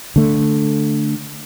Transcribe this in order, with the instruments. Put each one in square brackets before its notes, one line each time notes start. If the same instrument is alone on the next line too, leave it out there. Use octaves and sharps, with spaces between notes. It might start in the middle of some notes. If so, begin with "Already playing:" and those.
[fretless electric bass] D3 A3